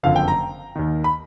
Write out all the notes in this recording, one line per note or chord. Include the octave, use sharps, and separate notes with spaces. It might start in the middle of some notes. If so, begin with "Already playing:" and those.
F#1 F2 D3 F5
G5
A#5
D#2 D#3
B5